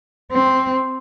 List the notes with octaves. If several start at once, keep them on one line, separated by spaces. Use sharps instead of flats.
C4